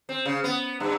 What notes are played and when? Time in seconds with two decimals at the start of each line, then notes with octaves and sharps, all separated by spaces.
0.09 C4
0.26 C#3
0.44 B3
0.80 G2